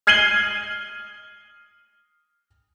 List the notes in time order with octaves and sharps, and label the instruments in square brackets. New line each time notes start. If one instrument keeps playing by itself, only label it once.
[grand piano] F6 G#6 C7 D#7 F#7 G7